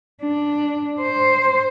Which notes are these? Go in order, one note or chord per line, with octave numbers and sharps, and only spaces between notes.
D4
C5